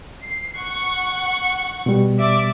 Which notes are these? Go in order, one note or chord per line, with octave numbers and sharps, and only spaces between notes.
C7
F#5 C#6
B2 G3
D5 E5 D6